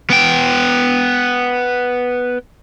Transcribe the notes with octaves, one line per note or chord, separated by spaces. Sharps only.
B3 G5